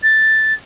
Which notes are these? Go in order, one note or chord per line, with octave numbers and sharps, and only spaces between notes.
A6